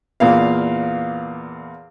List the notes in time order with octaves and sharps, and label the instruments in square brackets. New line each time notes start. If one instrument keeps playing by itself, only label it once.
[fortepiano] E2 A#2 F5